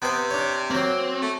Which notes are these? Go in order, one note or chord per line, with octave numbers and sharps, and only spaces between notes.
C3 B3 C5
D4 C#5
F#3 A#3 C4
A3